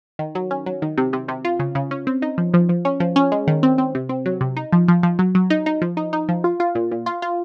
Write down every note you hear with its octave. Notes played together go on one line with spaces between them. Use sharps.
D#3
F#3
C#4
F#3
D#3
C3
C3
C3
F4
C#3
C#3
C#4
C4
D#4
F3
F3
F3
C#4
F3
C#4
G#3
D#3
C4
C4
C3
C4
F#3
C3
D#4
F3
F3
F3
F#3
F#3
D#4
D#4
F3
D#4
D#4
F3
F4
F4
A#2
A#2
F4
F4